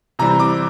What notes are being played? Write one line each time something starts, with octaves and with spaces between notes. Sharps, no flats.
C3 E3 G3 C4 A#5
D6